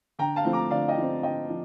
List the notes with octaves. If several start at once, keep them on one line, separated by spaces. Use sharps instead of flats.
D3 G5 A#5
F5 A5
F3 A3 C4
A#5 D6
D3 D5 F5
D#5 G5
F3 A3 C4
D3 D#5 G5
F3